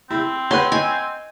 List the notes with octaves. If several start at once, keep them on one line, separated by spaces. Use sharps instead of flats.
C4 E4
B4 C#5 F#5 C6
D#5 G#5